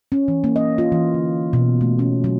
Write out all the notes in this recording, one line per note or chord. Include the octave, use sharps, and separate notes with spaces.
C#4
E3
A#3
D#5
F4
E3
D3
B2
A3
C#4
F#3